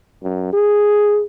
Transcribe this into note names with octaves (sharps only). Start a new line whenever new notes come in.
F#2
G#4